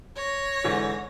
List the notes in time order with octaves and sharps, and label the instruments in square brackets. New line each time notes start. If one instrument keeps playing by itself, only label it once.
[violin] C#5 A#6
[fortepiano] G#2 D3 E3